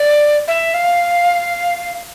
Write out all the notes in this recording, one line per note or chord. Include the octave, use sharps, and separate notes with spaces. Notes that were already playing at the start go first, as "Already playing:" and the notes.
Already playing: D5
E5
F5